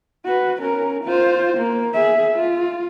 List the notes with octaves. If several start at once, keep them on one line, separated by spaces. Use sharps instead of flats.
F#4 B4
C#4 A#4
F4 C5
A#3
G#4 E5
F4